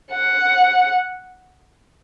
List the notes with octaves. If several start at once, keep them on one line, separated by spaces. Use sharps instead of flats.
F#5